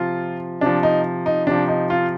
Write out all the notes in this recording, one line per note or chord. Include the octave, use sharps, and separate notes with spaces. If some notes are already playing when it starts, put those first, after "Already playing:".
Already playing: C3 F3 F4
C3 F3 D4
D#4
D#4
C3 F3 D4
D#4
F4